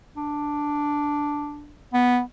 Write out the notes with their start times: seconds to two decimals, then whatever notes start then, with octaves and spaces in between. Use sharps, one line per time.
0.16 D4
1.93 B3